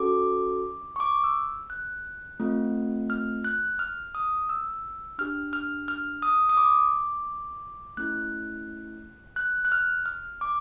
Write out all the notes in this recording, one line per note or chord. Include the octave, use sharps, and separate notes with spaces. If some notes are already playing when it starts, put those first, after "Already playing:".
Already playing: C#4 F#4 A4 D6
C#6
D6
E6
F#6
A3 C4 F4
F6
F#6
F6
D#6
E6
D4 G4 F6
F6
F6
D#6
D#6
D6
A3 C#4 E4 F#6
F#6
F#6
F6
F6
D6